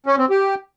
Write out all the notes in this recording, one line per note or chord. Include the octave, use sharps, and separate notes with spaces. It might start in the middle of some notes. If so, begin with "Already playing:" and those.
C#4
C4
G4